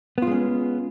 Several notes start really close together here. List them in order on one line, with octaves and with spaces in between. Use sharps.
B3 F4 G#3 C#4